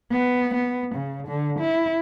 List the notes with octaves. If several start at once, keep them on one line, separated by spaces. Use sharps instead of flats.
B3
B3
C#3
D3
E4